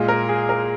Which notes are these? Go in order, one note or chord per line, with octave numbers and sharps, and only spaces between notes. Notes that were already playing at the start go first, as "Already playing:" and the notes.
Already playing: A#2 G#3 F4
A#4
G#4
A#4